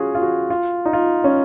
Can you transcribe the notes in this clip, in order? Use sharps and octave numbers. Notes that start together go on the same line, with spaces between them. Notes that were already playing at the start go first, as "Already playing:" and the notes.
Already playing: C#4 F4 F#4 G#4
F4
F#4
F4
D#4
F4
C#4